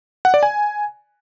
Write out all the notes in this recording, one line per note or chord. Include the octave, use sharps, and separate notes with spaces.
F#5
D5
G#5